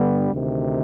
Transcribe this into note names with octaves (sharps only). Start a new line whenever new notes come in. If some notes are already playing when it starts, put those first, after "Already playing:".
Already playing: G2 D3 G3 B3 D4
D2 C3 D#3